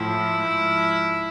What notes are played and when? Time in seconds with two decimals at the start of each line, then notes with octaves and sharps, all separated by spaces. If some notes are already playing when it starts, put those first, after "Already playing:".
Already playing: A2 F3 E4
0.37 G#2 F3